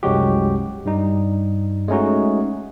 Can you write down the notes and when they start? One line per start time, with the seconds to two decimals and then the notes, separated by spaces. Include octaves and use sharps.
0.03 C2 F#2 F#3 G#3 F#4 G4
0.85 G2 G3 D#4
1.88 G#3 A3 C#4 D#4 F#4